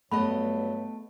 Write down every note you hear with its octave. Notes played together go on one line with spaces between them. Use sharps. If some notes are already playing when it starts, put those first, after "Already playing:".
G2 F#3 A3 B3 D#5 B5